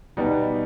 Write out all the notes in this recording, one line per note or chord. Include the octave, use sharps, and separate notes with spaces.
B2 G3 B3 D#4